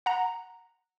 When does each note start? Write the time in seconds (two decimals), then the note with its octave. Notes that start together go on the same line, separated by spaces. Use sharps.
0.06 F#5 A#5